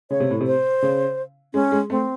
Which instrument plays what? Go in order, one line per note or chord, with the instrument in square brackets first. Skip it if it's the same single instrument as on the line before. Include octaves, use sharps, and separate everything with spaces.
[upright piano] C#3 [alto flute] C#5
[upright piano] C3
A2
C3
[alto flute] C5
[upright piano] C#3
[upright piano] G#3 [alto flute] C#4
[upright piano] G#3
[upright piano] A3 [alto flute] C4